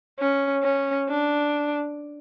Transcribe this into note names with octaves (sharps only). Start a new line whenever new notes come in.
C#4
C#4
D4